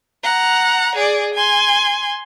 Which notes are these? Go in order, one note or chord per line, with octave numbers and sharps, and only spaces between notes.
F#5 A#5
G#4 D5
G#5 C6